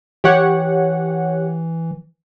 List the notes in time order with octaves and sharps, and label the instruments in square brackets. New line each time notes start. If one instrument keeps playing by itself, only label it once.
[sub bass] E3 [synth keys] G4 C#5 F#5